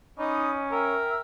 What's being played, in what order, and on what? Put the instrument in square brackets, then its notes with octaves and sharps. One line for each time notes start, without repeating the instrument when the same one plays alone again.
[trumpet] C#4 [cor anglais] D#4 [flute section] B5 D6 D#6
[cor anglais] A#4 [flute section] E5 G5 E6